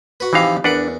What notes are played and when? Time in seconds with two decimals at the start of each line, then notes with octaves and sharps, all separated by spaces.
0.20 F#4 B4
0.33 C3 E3 F3 D#4 G4 F5
0.64 E2 D4 A#4 B4 F#5